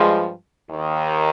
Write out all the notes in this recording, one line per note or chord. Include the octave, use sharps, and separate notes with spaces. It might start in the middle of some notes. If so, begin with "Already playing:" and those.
Already playing: G2 F3 G#3
D#2 D#3